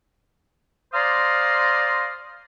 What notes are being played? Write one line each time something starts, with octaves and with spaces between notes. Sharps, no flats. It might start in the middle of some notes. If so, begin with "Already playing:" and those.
C5 D5 F5 A#5 C6 D#6